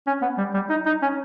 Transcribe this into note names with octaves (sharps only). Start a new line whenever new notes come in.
C#4
B3
G3
G3
D#4
D#4
C#4